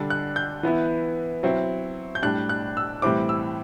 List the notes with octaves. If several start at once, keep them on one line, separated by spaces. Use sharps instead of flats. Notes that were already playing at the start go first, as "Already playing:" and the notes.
Already playing: D3 G3 D4
F#6
G6
E3 B3 E4
F#3 C4 E4
G6
A2 G3 D4 F#6
F#6
E6
A2 E3 G3 C4 E4 D6
E6